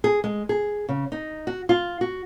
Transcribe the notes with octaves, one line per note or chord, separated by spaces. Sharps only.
G#4
G#3
G#4
C#3
D#4
F#4
F4
F#4